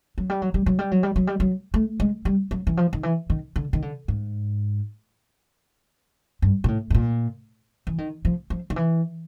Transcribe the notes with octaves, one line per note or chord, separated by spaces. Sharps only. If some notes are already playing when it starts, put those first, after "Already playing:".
F#3
G3
F#3
G3
F#3
G3
F#3
G3
F#3
G3
F#3
A3
G#3
G3
F#3
E3
F3
D#3
E3
D#3
D3
D#3
D3
G#2
G2
A#2
A2
A2
A#2
E3
D#3
F3
F3
D#3
E3